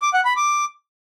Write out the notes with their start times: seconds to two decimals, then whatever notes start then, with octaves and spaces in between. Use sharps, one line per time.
0.02 D6
0.14 F#5
0.25 B5
0.37 D6